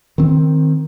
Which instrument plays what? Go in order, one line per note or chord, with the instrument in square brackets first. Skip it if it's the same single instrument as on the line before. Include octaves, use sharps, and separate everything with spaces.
[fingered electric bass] D#3 C4